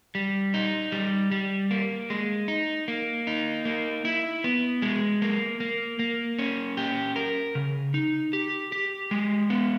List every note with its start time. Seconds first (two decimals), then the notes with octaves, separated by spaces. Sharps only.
0.15 G3
0.54 D#4
0.92 G3
1.31 G3
1.71 A#3
2.10 G#3
2.48 D#4
2.88 A#3
3.27 D#4
3.65 A#3
4.05 E4
4.44 B3
4.82 G#3
5.22 A#3
5.60 A#3
5.99 A#3
6.38 C#4
6.77 G4
7.16 A#4
7.55 C#3
7.94 D#4
8.33 G4
8.72 G4
9.11 G#3
9.50 B3